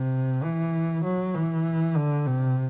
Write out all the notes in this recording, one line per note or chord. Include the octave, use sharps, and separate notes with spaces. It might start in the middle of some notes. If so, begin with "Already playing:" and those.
Already playing: C3
E3
F#3
E3
D3
C3